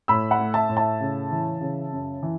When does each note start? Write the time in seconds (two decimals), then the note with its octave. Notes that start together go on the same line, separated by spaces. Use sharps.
0.08 A2 B5 E6
0.31 F#5 B5
0.39 A3
0.54 E5 A5
0.69 A2
0.77 E5 A5
1.01 C#3
1.31 E3
1.61 C#3
1.92 F#2
2.23 E3